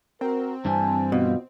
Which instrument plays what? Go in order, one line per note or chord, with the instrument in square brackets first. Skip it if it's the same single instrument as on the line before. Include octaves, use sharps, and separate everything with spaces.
[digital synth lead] C4 [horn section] F#4 A#4
[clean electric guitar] G2 E3 G3 [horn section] G#5 A5
[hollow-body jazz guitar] B2 [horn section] F4